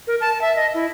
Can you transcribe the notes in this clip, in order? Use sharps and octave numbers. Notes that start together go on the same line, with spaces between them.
A#4
A5
E5
D#5
E4